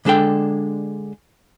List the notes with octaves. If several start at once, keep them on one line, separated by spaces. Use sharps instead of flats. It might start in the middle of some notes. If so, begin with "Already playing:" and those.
D3 G#3 D4 A4 G5